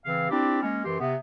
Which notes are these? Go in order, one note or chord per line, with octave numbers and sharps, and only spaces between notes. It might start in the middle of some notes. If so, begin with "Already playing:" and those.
C#3 E3 C4 F5
C4 D4 E4 G4
G#3 A#3 C#4
F#2 E3 G4 C6
C3 B3